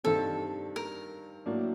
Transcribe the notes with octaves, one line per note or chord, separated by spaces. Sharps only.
G2 D#3 G3 C4 A4
A#4
A2 F#3 A#3 D4